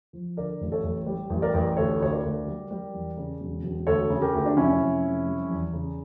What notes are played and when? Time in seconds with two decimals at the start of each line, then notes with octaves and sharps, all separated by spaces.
0.13 F3
0.37 D3 A#4 D5
0.61 A1
0.72 A4 C#5
0.83 A1
1.06 G3
1.30 A1
1.42 A#4 D5
1.54 A1
1.77 D2 A4 C#5
2.00 D2 C#5
2.11 A#4 D5
2.23 D2
2.47 G3
2.71 G3
2.93 E2
3.17 C#3
3.41 E1
3.63 E1
3.87 D2 A4 C#5
4.10 C#3
4.22 G4 A#4
4.33 D2
4.46 D4
4.56 F1 C#4 E4
4.80 F1
5.03 F2
5.26 G3
5.50 E2
5.73 C#3